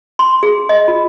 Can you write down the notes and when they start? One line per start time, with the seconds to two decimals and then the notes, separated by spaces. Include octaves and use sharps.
0.19 C6
0.43 G#4
0.69 D#5
0.88 F4